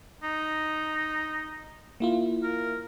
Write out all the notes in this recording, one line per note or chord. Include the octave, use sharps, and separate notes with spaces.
D#4
A#3 E4 F4
A#4